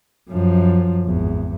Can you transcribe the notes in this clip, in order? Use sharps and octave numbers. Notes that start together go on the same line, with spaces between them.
F#2 F3
G#1 E2